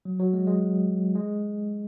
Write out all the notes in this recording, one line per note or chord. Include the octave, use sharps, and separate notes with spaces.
F#3
F#3
G#3
G#3
G#3